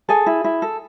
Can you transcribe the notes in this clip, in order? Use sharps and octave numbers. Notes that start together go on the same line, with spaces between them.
G#4 A4 G#5
E4
E4
A4